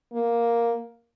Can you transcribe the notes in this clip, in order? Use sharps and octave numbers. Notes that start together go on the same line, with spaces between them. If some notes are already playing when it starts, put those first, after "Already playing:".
A#3